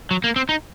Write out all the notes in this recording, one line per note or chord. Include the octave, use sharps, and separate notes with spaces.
F#3
A#3
C4
D#4